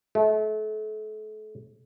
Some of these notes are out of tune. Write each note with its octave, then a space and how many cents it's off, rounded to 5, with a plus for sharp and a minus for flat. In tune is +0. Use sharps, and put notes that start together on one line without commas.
A3 -35